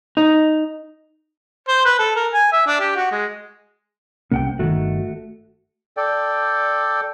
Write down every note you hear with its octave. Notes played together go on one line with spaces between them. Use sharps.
D#4
C5
B4
A4
A#4
G#5
E5
D4
G4
F#4
G#3
C2 C3 A#3 C#4 F#5 G5
G1 D3 D#3 A3 F#4
A4 D5 G5